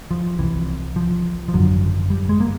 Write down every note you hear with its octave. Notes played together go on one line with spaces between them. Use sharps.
F3
C2 C3 E3
F3
F3
G#1 F#2 D3 F#3
G3
G#3
A#3